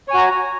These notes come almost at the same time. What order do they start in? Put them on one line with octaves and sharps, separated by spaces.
C#5 G#5 F#4 A#5